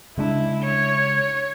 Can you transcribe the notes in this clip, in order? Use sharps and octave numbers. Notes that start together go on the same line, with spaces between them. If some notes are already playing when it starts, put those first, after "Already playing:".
C#3 G#3 D4 E4
C#5